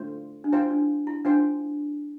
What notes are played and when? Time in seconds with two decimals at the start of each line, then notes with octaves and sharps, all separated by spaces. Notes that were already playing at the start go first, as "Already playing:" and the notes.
Already playing: A3 D4 F4 C5
0.44 D4
0.52 E4 F4 C5 G5
0.71 D4
1.07 E4
1.25 D4 F4 C5 G5